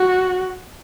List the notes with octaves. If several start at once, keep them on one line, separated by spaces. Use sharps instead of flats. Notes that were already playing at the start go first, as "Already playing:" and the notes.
Already playing: F#4